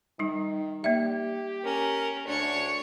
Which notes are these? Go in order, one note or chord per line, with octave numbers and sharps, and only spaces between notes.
D#3 G3 D#4
A#3 G4 D5 E5
C#4 A#4
D2 D4 C#5 C#6